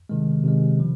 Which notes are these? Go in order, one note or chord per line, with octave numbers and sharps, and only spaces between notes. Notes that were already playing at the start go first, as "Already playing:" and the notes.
C3 D#3 G#3
C3 D#3 G#3
C#3 F3